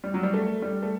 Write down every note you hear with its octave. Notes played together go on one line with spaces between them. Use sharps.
G3
F#3
G3
A3
G3
A3